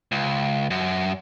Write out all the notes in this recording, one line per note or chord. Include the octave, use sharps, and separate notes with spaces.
C#2
F#2